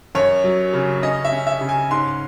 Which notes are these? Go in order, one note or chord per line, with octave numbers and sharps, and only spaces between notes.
F#2 C#5
F#3
C#3
C#4 D#5
E5
C#4
E5
C#3
G#5
G#2 C6